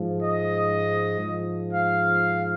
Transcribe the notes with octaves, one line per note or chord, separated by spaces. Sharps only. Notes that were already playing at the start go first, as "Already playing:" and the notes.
Already playing: G#2 F3
D#5
G#2 F3
F5